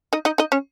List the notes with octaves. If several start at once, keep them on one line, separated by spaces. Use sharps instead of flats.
D#4 D#5
D#4 D#5
D#4 D#5
C#4 C#5